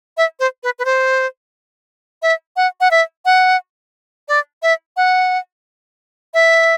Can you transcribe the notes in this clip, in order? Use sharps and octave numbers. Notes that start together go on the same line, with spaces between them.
E5
C5
B4
B4
C5
E5
F#5
F#5
E5
F#5
D5
E5
F#5
E5